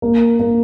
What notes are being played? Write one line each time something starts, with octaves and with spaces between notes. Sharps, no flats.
A#3
A#3